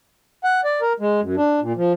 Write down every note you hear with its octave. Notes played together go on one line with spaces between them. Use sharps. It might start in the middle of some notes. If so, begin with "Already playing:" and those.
F#5
D5
A#4
G#3
F#2
D4
A#2
F3